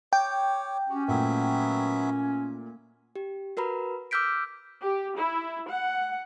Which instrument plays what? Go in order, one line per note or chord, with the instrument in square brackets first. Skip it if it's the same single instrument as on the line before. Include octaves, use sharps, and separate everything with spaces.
[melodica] C#5 D6 [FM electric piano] G5
[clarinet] C#4 [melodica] F#4 G4
[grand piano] A#2 A3 [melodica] F#3 B3 E5
[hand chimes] G4
F#4 A#4 B4 A#5 B5
D6 E6 F6 G6 B6 D7
[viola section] G4
E4
F#5